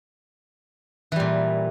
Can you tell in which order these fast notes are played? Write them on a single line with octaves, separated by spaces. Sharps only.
E3 G3 A#2